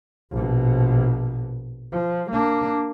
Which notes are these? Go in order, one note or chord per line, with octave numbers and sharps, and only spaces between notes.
A#1 B2
F3
A#3 D4